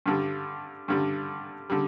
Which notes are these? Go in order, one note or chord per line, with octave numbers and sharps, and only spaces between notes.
G2 D3 G3
G2 D3 G3
D3 G3